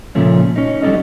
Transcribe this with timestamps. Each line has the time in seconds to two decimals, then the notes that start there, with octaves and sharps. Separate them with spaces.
0.15 A#2 C#3 F3 A3 C#4
0.56 C#4 D#4
0.82 F#3 G3 C#4 D#4 A4 D#5